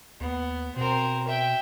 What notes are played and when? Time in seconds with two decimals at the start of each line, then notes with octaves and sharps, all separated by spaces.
0.20 D#2 B3
0.76 B2 C4 A#4
1.27 E5 G5